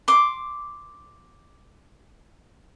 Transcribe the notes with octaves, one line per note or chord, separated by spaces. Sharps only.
C6 D6